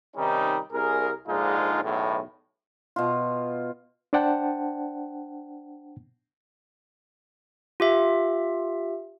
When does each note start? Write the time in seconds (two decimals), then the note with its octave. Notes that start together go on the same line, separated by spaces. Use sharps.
0.16 C3 D#3 G3 C#4 D#4
0.73 C2 G#4 A#4
1.28 A#1 G#2 D3 G#3 D#4 F4
1.83 B1 E2 A2
2.96 B2 F4
4.13 D4 C5 D5 F#5 G5 A5
7.80 F4 G4 E5